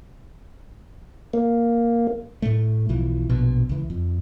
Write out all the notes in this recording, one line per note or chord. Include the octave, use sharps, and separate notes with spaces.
A#3
A2 A3
B1 E3 F3
A#1 B2
C#2 E3
F2